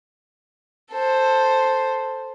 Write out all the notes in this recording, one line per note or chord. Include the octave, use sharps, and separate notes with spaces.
A4 C5